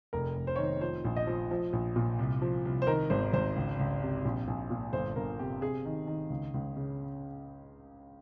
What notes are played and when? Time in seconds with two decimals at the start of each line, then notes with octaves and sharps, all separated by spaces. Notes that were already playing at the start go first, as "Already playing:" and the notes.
0.13 F1 A#4
0.37 F1
0.47 C5
0.56 D#3 C#5
0.64 C5
0.81 F3 C5
1.05 A#1
1.16 D#5
1.27 F3
1.51 F3
1.73 A#1
1.96 A#2
2.19 C2
2.42 F3
2.65 C2
2.82 C5
2.87 D#3 A#4
3.10 G#1 C5
3.33 G#1 C5
3.56 C#2
3.79 C#2
4.02 C3
4.25 A#1
4.48 A#1
4.70 A#2
4.93 G1 C5
5.16 G1 A#4
5.39 C3 G4
5.62 C3 G#4
5.85 D#3
6.07 D#3
6.30 C#2
6.54 C#2
6.76 C#3